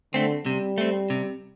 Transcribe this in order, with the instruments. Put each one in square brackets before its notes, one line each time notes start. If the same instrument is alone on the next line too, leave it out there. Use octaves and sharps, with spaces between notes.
[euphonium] D3 [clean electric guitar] A3 C4
[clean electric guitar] C3 [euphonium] G3
[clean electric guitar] A3 C4
C3